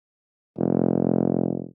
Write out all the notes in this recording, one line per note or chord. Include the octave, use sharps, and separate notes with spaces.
F1